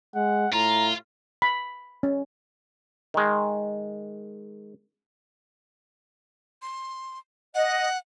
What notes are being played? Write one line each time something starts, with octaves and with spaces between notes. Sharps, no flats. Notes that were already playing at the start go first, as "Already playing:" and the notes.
G#3 F#5
A2 F4 A#5
B5
C#4
D#3 G#3
C6
D#5 F#5